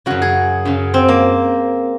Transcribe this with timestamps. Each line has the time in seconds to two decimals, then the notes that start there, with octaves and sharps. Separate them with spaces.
0.06 F#2 C#3 F#4
0.22 G#4
0.65 F#2 C#3
0.94 C4
1.09 A#3